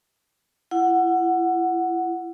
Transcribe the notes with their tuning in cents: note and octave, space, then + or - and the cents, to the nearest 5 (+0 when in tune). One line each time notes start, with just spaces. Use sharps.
E4 +35 F#5 +0